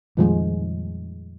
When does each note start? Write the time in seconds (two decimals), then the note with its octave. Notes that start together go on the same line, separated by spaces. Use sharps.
0.17 F2 A#2 D#3 F3 G3 G#3